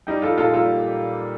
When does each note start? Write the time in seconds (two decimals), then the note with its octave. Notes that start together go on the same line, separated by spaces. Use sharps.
0.07 G3 D#4 G4
0.22 F4 A4
0.37 A#2 F4 A4
0.54 F4 A4